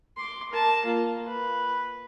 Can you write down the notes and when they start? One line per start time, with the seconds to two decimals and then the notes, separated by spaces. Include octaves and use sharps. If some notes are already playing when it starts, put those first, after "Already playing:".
0.17 C6 D6
0.50 A#4 A5
0.84 A#3 F4
1.28 B4